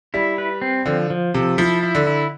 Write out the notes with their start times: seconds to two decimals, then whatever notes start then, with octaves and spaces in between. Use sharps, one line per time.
0.14 G3 E4
0.38 B4
0.62 C4
0.86 D3 F3
1.10 F3
1.34 C3 A4
1.58 F3 E4
1.83 E4
1.95 D3
2.07 E4